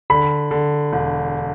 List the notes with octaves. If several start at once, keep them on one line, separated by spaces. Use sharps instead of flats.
D3 B5
D3
E1